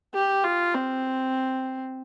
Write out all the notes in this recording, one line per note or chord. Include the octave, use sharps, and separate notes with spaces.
G4
F4
C4